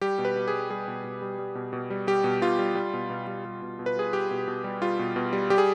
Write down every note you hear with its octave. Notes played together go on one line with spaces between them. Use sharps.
G3 G4
B2
B4
B2
G#4
G3
G3 G#4
B2
B2
G3
G3
B2
B2
G3
G3 G4
B2
B2 F4
G3
G3
B2
B2
G3
G3
B2
B2
B4
G3 G#4
G3 G4
B2
B2
G3
G3 F4
B2
B2
G3
G3 G4
G#4